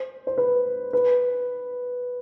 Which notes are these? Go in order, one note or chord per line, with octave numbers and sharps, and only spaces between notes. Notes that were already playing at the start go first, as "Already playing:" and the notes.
Already playing: C5
C5
B4
B4